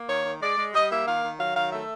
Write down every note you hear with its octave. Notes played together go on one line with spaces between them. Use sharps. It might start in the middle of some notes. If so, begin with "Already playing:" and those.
Already playing: A#3
D#3 C#5
D#3
G#3 D5
G#3
G3 D#5
A#3 E5
D#3 F5
D#3
F#3 F5
D#3 F5
A3 E5